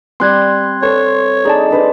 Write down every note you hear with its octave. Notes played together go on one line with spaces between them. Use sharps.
G3 C4 C6 F#6 G#6
A4 C5 C#5
D#4 G#4 D5 A5
D4 B4 C5